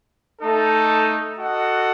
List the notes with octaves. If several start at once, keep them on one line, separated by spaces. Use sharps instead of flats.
A3 D#4 A4
F#4 A4 D#5 F#5